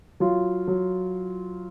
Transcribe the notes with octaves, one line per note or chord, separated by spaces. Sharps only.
F#3 F4
F#3